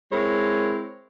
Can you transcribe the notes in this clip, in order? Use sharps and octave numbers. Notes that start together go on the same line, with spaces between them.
G#3 C4 E4 A#4 C#5